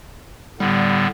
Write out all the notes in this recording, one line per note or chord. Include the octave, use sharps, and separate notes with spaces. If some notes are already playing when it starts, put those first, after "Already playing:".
A2 D3 G3 B3